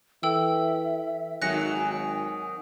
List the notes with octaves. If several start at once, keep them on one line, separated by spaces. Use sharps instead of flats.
E3 A4 E5 G5 E6
G#1 D#3 F#3 G#5 F#6 A#6 C#7